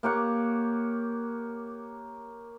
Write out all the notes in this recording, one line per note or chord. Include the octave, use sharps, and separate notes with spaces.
A#3 G4 C#5 F#5